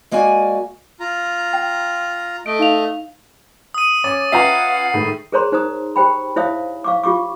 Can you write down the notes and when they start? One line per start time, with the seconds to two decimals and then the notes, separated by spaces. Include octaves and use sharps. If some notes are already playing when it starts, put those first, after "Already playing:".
0.11 G#3 A#3 F#4 D5 G#5
1.00 F4 A#5
1.53 G5
2.46 A3 D#5 D7
2.59 D#4 F5 F7
3.74 D#6 D#7
4.04 C#4 D6 A6
4.32 C#4 F4 B4 E5 F#5 G5 A#5 C7
4.94 A2 D#3 G#3
5.32 G#4 A#4 C5 C#5 A#5 C6
5.52 D#4 C5 A#5 D#6
5.96 G4 C5 G5 B5
6.36 E4 C5 C#5 E5 F5 D#6
6.84 F5 C#6 D6
7.03 F4 G4 C#6 D6